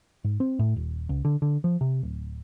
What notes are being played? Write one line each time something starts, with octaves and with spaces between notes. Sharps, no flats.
G#2
C4
A2
D#1
C#2
D3
D3
F3
C3
D1